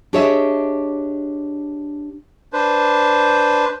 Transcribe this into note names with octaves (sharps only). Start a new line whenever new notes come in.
D4 G4 G#4 C#5 D#5 E5
D4 B4 C5